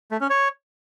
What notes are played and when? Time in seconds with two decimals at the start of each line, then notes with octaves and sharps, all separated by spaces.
0.11 A3
0.21 C#4
0.30 C#5